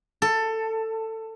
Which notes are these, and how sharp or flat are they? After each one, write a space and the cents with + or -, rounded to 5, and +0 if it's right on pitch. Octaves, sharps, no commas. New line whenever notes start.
A4 +15